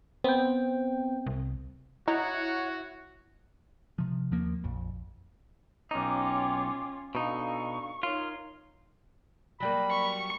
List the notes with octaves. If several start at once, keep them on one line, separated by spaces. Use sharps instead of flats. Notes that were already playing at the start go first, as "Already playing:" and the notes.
B3 C4 G5
C2
D#4 E4 F#4 C#5 F#5
C3 F3
D#2 F3 A#3
A#1 F2
B1 C#4 D#4 F4 G5 D6
B2 D4 D#4 A4 F5 C#6
D#4 F4 A#4 C#5
F#3 G3 A#3 B5
C#6